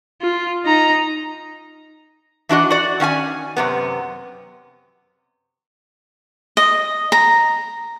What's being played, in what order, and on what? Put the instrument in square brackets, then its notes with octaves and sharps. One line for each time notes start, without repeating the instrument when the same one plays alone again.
[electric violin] F4
D#4 A#5
[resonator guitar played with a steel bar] E3 D4 F#4 D#5
F#4 D5
D#3 C#4 F#5 G#5
F#2 C3 B3
[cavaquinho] D#5
A#5